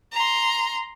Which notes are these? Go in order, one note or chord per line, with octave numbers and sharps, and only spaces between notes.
A#5 C6